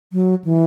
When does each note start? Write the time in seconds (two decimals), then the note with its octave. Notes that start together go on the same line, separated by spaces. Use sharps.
0.13 F#3
0.44 E3